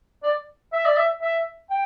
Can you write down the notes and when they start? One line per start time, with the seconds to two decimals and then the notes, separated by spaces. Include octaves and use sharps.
0.23 D5
0.73 E5
0.86 D5
0.97 E5
1.22 E5
1.70 G5